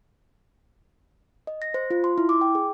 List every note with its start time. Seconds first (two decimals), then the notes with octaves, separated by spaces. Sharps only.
1.47 D#5
1.62 A#6
1.74 C5
1.90 F4
2.04 C6
2.18 E4
2.29 D6
2.41 G5
2.55 G#4